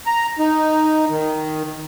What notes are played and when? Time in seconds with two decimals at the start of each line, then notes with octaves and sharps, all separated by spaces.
0.07 A#5
0.39 D#4
1.09 D#3